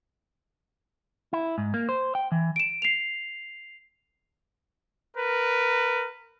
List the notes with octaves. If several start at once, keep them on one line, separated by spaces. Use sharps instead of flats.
E4
G#2
A#3
C5
G5
E3
D7 E7
C7 F7
A#4 B4